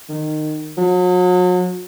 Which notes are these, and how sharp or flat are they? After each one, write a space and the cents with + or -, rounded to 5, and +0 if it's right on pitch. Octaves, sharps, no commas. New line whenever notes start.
D#3 -20
F#3 -40